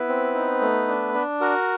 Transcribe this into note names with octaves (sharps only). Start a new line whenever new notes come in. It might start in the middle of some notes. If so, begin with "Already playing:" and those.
Already playing: B3 E4 B4
C4
D#4
A3
D4
D4
F#4 A#4